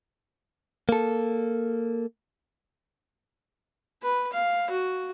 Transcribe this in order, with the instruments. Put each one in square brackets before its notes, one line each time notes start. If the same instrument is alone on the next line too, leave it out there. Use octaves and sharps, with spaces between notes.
[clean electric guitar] A#3 A4
[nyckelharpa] B4
F5
F#4